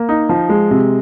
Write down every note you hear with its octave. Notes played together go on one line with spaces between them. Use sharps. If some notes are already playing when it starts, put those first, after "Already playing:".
Already playing: A#3
D#4
F3
G#3
C3